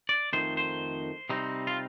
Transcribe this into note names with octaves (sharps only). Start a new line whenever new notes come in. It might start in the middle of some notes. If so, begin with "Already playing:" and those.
D5
F2 D#3 A3 D#4 C5
C5
C3 G3 C4 D#4
F4